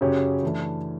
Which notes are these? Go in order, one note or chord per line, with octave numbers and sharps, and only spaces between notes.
F#2 C#3 F#3 C#4 G4
E3 A3 D4